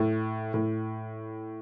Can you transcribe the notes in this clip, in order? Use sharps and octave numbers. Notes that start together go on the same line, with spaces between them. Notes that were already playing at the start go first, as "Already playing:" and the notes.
Already playing: A2
A2